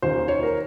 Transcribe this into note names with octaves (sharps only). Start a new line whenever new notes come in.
D#2 D#3 G3 A#3 C#4 C5
C#5
A#4